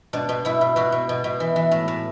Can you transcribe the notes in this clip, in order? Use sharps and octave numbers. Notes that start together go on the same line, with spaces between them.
B2 D4
B2
B2 E4
B2
B2 F#4
B2
B2
B2
E3
E3
A2
A2